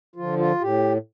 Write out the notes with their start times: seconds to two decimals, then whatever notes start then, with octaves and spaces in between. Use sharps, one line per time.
0.16 D3 F3 F4
0.39 F4
0.61 A2 G4